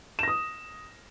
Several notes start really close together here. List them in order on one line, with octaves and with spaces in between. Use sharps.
E7 A#6 D#6